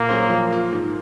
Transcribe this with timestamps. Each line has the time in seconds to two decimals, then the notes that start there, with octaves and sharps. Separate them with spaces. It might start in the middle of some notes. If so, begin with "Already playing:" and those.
Already playing: A#2 A#3
0.09 F#3 C#4 G#4 C5
0.29 F3
0.50 A#3 F4
0.72 G#2